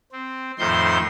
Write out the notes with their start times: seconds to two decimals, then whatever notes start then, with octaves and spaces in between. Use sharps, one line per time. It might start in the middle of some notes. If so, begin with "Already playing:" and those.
0.12 C4
0.59 F2 A2 D#3 C5 C6 G6